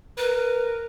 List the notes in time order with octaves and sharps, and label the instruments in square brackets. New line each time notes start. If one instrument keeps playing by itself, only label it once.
[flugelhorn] A#4 [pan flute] B4